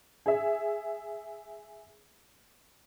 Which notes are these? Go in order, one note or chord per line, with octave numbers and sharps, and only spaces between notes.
G#4 E5